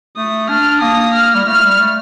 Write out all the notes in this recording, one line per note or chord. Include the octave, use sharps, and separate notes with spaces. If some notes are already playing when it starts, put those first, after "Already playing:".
A3 D#6
D4 F6
A#3 D#6
F6
G3
A3 F6
G3
A3